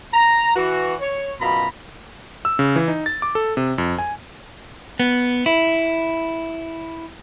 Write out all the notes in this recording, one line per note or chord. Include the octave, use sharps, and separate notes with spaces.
A#5
E3 F#4
C#5
F#2 B2 F4 A#5 B5
E6
C#3
E3
D#4
A6
D6
A4
C3
F2
G#5
B3
E4